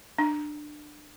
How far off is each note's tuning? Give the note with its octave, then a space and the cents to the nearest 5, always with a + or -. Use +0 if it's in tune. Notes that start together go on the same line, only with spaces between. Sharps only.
D4 +25